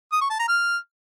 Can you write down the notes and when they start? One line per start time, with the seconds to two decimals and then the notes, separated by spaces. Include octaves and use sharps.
0.12 D#6
0.21 C#6
0.30 A5
0.39 A#5
0.48 F6